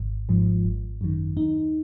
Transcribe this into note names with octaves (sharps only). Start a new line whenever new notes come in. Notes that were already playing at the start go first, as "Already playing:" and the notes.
Already playing: G#1
G#2 F3
G#1
F#2 D#3
D#2 D#4